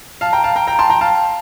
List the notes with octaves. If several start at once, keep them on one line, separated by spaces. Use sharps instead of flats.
F5 A5
G5 A#5
F5 A5
G5 A#5
G5 A#5
A5 C6
G5 A#5
F5 A5